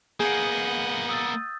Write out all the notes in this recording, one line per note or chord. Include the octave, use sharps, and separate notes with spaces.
A#3 B3 G#4 D#5 F#5 G6
D#6 E6 A6